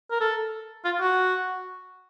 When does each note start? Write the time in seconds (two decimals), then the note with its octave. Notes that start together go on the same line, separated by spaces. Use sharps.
0.11 A#4
0.21 A4
0.85 F4
1.01 F#4